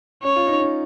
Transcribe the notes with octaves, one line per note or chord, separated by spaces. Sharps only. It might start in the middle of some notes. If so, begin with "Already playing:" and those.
C#4 C#5
F4
D#4
C#4